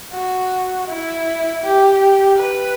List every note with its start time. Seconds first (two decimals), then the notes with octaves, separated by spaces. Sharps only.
0.13 F#4
0.87 E4
1.63 G4
2.38 B4